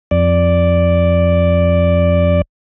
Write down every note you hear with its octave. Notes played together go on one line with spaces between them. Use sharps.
F2 D5